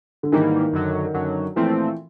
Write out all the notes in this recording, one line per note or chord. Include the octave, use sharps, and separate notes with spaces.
D3
G#2 D#3 E3 G3 A#3
F#2 D3 F#3
F#2 D3 F#3
A#2 E3 F3 A3 C4